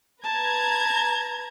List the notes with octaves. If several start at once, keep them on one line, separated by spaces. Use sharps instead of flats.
B4 A5 A#5 G#6